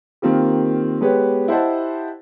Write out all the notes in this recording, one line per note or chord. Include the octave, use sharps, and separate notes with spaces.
D#3 A#3 C4 F4 G4
G#3 B3 G4 B4 C#5
E4 G4 C5 D#5 F#5 A5